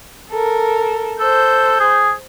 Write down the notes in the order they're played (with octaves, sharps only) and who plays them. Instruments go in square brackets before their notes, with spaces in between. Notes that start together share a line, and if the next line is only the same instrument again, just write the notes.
[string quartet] A4 A#4
[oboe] A4 [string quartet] C5 G6
[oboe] G#4